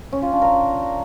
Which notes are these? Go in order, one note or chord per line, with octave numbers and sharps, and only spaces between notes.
C#4
F4
D4
A#4